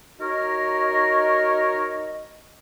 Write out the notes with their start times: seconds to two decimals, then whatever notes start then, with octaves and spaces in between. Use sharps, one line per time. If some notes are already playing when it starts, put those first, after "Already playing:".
0.20 D#4 F#4 A#4 C#5 D#5